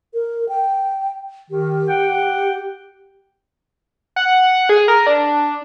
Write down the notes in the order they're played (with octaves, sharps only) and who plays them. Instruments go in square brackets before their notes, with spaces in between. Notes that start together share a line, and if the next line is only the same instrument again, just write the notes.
[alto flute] A#4
G5
[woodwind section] D#3 [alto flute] G4
[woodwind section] F#5 G5
[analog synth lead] F#5
G#4
A#4
D4